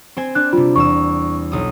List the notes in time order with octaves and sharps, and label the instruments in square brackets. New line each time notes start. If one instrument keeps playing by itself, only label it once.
[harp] C4 C5 G#5
[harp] D4 [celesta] F#6
[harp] C3 G3 [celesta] F4
[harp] E2 A#3 E6 [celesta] C#6
[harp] B1 D#6